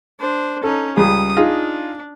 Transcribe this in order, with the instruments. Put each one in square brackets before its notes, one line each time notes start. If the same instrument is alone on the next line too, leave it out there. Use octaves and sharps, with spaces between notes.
[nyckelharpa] D4 C5
[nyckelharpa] C#4 D#4 [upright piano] A4
[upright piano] C#2 G3 G#4 [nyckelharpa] D#6
[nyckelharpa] D4 [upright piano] D#4 F4 G#4